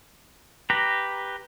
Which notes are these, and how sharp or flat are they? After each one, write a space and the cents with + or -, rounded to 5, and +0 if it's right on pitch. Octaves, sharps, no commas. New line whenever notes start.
G4 +0 B4 +0 A#5 +0